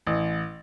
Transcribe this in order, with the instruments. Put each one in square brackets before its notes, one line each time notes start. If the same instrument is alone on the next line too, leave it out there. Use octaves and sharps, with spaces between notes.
[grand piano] A1